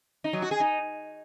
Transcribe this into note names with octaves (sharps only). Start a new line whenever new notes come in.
D#4
F#3
F#4
G#4
D#4